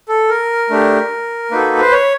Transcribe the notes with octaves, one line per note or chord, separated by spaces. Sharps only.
A4
A#4
A3 D4 G4
A#3 D#4 F#4 A4 B4
C5
C#5